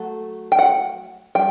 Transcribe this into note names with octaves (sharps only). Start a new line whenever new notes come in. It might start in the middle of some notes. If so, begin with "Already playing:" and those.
Already playing: F#3 A3
G5
F#5
G3 G5